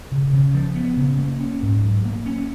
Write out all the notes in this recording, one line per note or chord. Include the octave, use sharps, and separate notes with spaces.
C#3
C#3
F3
B3
C#3
A#3
C#4
G#2
F#3
A#3
C#4